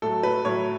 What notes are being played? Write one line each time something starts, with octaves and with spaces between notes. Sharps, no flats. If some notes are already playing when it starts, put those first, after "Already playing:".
A2 F#3 A4
B4
A2 F#3 C#5